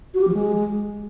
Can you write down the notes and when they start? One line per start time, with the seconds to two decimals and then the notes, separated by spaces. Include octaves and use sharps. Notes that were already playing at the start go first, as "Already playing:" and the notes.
0.14 F#4
0.21 G4
0.27 F3
0.34 G#3